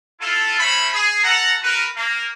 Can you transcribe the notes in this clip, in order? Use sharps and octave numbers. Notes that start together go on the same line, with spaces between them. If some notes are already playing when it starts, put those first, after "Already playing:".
E4 F4 A4
A3 C#4 E4 C5 C#5 B5
G#4
A4 F#5 A#5
F#4 A#4 B4
A#3